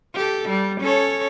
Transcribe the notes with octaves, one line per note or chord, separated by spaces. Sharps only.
G4 A4
G3
C#4 A4 C#5